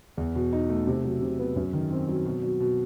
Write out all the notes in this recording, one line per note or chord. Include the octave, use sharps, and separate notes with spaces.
E2
B2
D#4
A3
C3
F#3
C3
B3
F#2
D#3
C4
F#3
B2
F#3
B2